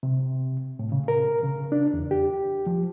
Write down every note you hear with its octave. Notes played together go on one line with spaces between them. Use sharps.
C3
A2
C#3
A#4
C#3
D4
E2
G4
F3